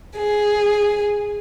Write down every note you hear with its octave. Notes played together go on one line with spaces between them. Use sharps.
G#4